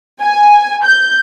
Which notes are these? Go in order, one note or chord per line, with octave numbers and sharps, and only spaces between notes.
G#5
G6